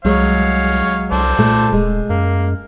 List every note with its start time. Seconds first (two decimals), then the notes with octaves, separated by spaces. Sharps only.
0.05 C2 F#3 G#3 C#5 F5
1.12 C2 A4 C5 D5
1.39 A#2 A3
1.73 D#1 G#3
2.10 F#2 A#3